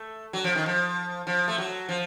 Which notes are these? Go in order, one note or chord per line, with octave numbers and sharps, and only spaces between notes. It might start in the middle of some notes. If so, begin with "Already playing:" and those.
Already playing: A3
F#3
F3
D#3
F3
F3
A3
F#3
F3